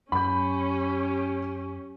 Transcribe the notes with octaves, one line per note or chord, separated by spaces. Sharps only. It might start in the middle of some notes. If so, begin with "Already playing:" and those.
F#2 C#4 G4 B5 G6